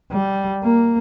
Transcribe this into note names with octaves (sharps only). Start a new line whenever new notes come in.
G3
A#3